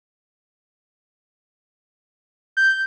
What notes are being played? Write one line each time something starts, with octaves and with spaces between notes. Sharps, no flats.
G6